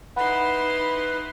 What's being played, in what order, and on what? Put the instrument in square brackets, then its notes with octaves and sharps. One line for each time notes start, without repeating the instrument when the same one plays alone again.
[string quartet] D#4 E4 C6 [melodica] B4 [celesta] F#5 B5